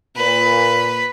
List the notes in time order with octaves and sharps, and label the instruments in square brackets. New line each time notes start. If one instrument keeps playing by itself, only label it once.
[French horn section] A#2 [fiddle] B4